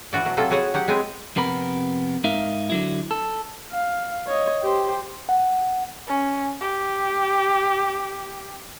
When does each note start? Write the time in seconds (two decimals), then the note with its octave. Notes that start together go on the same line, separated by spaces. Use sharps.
0.13 E3 F#4 D5
0.25 B2 F#3
0.37 C3 F#3 F4 A4
0.50 E4 F#4 G#4 C#5 F#5 A5
0.74 F#3 G4 F#5
0.88 G#3 B3 C4 G#4 G5
1.36 F2 C3 B3 A#4 B5
2.24 G#2 D#4 A#4 E5 F5
2.70 D3 F#3 E4
3.11 A4
3.71 F5
4.28 C#5 D#5
4.63 G4 C5
5.29 F#5
6.07 C#4
6.61 G4